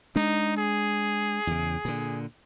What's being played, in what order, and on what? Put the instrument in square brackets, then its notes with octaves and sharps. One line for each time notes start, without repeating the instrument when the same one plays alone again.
[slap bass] G#3 D4 [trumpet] D#4
[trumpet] G#4
[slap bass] E2 C#3
A#2 D3